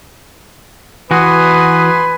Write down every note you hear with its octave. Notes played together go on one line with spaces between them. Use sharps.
E3 F#4 B4 G#5 C6 D#6